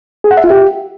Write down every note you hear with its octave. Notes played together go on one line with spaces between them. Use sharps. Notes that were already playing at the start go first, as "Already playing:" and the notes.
G#4
F#5
E5
F4
G4